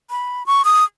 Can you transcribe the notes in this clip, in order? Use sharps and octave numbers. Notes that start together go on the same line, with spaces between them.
B5
C#6
D#6